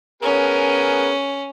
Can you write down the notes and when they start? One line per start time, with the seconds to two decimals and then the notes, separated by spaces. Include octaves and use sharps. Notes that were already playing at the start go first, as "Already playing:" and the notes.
0.23 B3 C#4 G#4 A#4